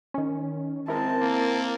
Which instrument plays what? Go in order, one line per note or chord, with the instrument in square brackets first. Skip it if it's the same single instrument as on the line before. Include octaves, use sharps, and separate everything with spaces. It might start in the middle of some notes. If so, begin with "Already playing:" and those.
[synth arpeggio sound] D#3 C#4
[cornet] G#3 [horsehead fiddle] C4 A5 [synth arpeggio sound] E4 A#4
[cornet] A#3